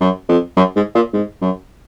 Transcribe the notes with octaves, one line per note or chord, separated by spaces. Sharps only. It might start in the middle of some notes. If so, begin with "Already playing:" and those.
F#2
F2
F#2
G#2
A#2
G#2
F#2